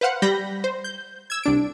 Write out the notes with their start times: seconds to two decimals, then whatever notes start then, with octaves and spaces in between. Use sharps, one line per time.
0.01 B4 C5 F5 F#5
0.22 G3 B5 G6 A#6
0.64 C5
0.84 G6
1.30 E6 G#6
1.43 C2 D4 D7